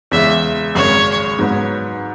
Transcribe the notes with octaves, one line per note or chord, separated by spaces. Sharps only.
E2 C#3 G#3 E5
G#1 F#2 C#3 G#3 C#5
G#2 F#3 B3